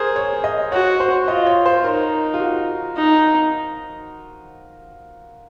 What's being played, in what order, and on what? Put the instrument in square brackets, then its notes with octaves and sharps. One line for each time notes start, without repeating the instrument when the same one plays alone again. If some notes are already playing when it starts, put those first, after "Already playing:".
Already playing: [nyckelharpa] G#4 [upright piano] A#4 C5
[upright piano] C#5
D#5
[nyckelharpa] F#4 [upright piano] C#5
[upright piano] C5
[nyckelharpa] F4 [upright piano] D#5
[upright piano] C#5
C5
[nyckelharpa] D#4 [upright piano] A#4
[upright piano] F4
F#4
[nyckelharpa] D#4